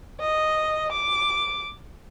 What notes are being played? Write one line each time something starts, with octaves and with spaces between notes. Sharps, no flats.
D#5
D6